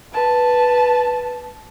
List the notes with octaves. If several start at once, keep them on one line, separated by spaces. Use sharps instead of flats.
B4 A5